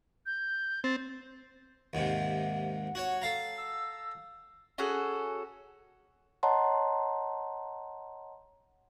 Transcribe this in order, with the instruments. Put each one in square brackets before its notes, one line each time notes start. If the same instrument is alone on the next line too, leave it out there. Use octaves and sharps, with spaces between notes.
[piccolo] G6
[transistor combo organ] C4 [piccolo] A6
[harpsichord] D#2 G#2 C3 [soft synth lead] F#5
[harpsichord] F#4 C#5
A4 F5 A#5
[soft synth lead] E6
[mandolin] C#4 F#4 G#4 A4
[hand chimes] C#5 D#5 F#5 A5 A#5 C6